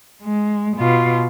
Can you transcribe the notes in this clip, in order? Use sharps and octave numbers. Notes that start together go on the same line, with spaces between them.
G#3
B2 F4